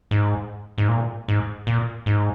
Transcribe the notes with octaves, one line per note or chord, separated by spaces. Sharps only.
G#2
G#2
A#2
G#2
A#2
G#2